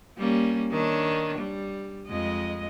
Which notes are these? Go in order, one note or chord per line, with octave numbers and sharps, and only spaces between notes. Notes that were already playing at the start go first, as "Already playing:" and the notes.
G3 A#3 C#4
D#3 D4 C#5
G3
F2 G#3 D#5